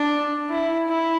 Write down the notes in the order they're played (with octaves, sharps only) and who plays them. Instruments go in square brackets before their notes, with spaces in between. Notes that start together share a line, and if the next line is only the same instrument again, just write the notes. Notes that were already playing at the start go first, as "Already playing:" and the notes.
Already playing: [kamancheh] D4
E4
E4